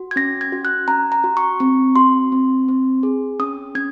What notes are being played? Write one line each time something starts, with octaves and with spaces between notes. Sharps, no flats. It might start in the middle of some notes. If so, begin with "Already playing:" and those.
Already playing: F#4
G#6
C#4 A#6
G#6
F#4
F#6
C#4 A#5
A#5
F#4
C#6
C4 C#6
F#4 C6
C4
C4
G#4
C#4 D#6
C#4 G#6